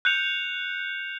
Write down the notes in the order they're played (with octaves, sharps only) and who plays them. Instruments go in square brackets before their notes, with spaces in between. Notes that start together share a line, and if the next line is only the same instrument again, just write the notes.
[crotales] F#6 G6 C#7 F7